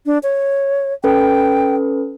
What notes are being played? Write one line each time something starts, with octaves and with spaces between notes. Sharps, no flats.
D4
C#5
C#4 A4 B4 G5